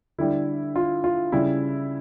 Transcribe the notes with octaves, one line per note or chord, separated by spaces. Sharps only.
D3 G3 E4
F4
F4
C#3 G3 E4